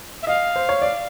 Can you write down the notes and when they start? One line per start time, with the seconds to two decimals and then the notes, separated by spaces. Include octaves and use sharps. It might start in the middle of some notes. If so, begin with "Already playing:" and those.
0.22 E5
0.27 D#5 F5
0.56 C5
0.69 C#5
0.82 D5